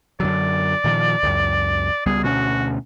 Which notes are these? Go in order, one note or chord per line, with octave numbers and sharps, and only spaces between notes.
F#2 D3 F#3 D5
A#2 D#3 F3
C#2 F#2
C#2 G3 B3 G#4
D2 B2 C#4 F#4